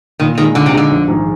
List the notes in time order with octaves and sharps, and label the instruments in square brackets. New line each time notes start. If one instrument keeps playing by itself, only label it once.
[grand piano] A#2 [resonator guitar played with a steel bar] D#3
[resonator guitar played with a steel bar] D#3 [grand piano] G#3 D#4 G#4
[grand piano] A#2 [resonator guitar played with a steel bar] D3
[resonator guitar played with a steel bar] C3
[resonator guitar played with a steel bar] D3 [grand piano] G#3 D#4 G#4
[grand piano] A#1
G#2 D#3 G#3